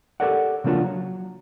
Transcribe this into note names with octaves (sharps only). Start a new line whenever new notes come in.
G4 A4 A#4 C#5 D5 F#5
C#3 F3 A#3 D4 F4 F#4
F#3